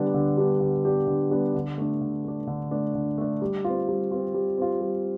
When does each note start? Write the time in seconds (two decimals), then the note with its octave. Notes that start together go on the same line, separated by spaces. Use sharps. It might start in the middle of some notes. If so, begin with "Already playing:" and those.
Already playing: D3 G3 B3 D4 G4
0.14 D3
0.38 G3 B3 D4 G4
0.61 D3
0.85 G3 B3 D4 G4
1.08 D3
1.31 G3 B3 D4 G4
1.55 D3
1.78 A3 D4
2.01 D3
2.24 A3 D4
2.47 D3
2.71 A3 D4
2.95 D3
3.18 A3 D4
3.42 G3
3.64 C4 F4
3.89 G3
4.11 C4 F4
4.34 G3
4.58 C4 F4
4.81 G3